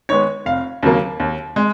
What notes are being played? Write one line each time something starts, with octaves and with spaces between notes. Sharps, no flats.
D#3 G#3 B3 C#5
F1 F5
D#2 C#3 F#3 A#3
D#2
G#3